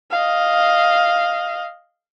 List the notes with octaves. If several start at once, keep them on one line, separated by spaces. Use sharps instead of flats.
D#5 F5